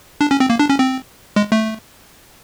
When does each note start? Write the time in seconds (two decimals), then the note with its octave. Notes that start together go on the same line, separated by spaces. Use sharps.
0.21 D4
0.31 C#4
0.40 C4
0.50 A#3
0.59 D4
0.69 C#4
0.79 C4
1.36 G#3
1.52 A3